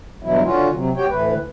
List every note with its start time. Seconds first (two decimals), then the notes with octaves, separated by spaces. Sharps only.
0.23 G2 B2 E3 F#3 E4
0.44 D3 C#4 F4 F#4
0.73 C3 F#3
0.97 F#4 G4 C#5 G5
1.10 D2 A2 E3 B4